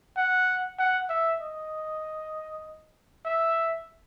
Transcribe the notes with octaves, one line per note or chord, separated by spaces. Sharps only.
F#5
F#5
E5
D#5
E5